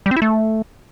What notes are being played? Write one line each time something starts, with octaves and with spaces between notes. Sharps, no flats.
G3
C4
E4
A3